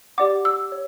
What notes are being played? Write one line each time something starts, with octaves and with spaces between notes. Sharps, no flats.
G4 D5 F#5 D6
E6
C#5